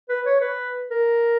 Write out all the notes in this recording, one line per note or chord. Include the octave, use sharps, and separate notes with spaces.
B4
C#5
B4
A#4